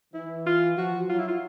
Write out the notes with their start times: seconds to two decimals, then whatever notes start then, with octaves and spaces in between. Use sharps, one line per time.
0.14 E3 E4
0.46 F4
0.77 F3 F#4
1.09 F#3 F4
1.19 E4
1.28 F4